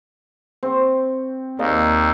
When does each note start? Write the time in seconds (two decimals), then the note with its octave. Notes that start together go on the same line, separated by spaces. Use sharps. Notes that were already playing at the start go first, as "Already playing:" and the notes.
0.63 C4 C#6
1.59 D#2 A#3 D5 D#5